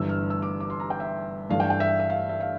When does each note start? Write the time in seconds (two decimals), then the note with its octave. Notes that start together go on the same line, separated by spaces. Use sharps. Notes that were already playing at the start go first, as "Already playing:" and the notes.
Already playing: G1 G2 E3 E6
0.09 F6
0.30 E6
0.42 D6
0.60 D6
0.70 C6
0.80 A#5
0.90 G5
1.00 E5
1.49 G2 E3 A3 D4 F5
1.60 G5
1.70 G5
1.80 E5
2.00 E5
2.10 F5
2.29 E5
2.40 F5